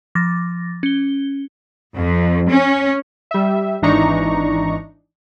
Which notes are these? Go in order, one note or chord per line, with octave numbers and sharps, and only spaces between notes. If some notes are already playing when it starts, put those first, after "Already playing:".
F3 D6 A6 A#6
C#4 G7
F2
C#4
G3 E5
G#1 E3 D4 D#4 A#5 C#6